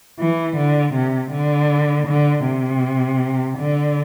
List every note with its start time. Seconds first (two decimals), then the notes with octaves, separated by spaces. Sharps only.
0.19 E3
0.57 D3
0.94 C3
1.32 D3
2.07 D3
2.45 C3
3.58 D3